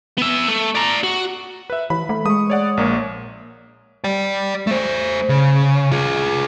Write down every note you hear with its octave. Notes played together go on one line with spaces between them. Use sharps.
B3 E5
A3
D5 A#5
F#4
B4 E5
E3 B5
A3
G#3 C#6 D#6
C#5 D5 F#5
A#1 A#3 C#5
D5 G5
A3 C5
C#3
F4 G#4